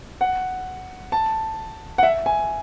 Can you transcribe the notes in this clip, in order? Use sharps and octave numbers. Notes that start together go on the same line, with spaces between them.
F#5
A5
F#5
E5
G#5